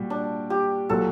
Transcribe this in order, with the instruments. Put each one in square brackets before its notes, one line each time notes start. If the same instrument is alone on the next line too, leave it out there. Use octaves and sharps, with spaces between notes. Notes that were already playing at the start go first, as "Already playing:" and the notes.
Already playing: [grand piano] A#2 G3 F#4
[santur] D4
G4
[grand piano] A#2 F#3 [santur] A4